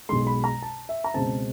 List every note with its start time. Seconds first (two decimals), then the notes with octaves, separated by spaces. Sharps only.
0.09 B1 B2 G#3 C6
0.27 B5
0.44 A#5
0.62 A5
0.89 E5
1.04 A#5
1.14 C#2 B2 G#3 C4 A5